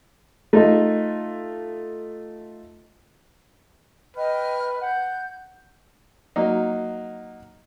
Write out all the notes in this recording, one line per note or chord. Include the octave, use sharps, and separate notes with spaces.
A3 D#4 F4 A4
B4 D#5 G5 F6
F#5 G6
F#3 A#3 D#4